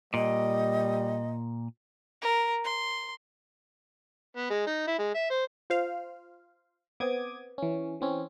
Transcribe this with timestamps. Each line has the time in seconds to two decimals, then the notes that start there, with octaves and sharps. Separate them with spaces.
0.14 A#2 G3 D#5
2.22 A#4
2.64 C6
4.37 B3
4.50 G#3
4.67 D#4
4.87 E4
4.99 G#3
5.14 E5
5.30 C5
5.70 F4 C5 F5
7.00 B3 C4 D6 D#6 G#6
7.58 E3 C#4
8.01 E3 C4 C#4